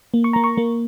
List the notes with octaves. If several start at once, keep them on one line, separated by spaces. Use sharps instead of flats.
A#3
C#6
A#3 A#5
C#6
A#3